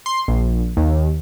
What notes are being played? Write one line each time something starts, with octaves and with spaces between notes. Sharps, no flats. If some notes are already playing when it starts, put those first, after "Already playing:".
C6
A#1
D#2